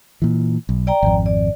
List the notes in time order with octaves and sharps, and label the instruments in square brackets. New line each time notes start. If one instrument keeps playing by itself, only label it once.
[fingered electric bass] A#2 E3
B1
[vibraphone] D5 G5 A#5
[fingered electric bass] G#1 F2
[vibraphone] D5